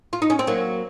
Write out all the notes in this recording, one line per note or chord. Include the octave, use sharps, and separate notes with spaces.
F4
D#4
C#4
C4
F#3 A#3